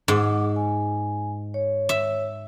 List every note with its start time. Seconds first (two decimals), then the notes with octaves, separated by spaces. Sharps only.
0.08 G#2 F#5 D6
0.56 G#5
1.54 C#5
1.89 E5